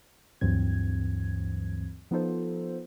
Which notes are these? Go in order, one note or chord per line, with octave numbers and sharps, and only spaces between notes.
D2 G2 E3 F#3 C4 G#6
F3 B3 D#4 F4 A4 C5